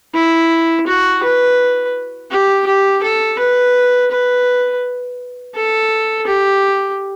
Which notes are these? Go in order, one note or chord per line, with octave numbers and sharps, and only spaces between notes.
E4
F#4
B4
G4
G4
A4
B4
B4
A4
G4